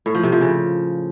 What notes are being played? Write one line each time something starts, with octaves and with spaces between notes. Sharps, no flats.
A2
F3
C3
F3
C#3